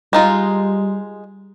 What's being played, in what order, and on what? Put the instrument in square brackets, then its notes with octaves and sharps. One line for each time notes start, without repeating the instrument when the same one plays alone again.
[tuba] G3 [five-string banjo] G#3 D#4 F4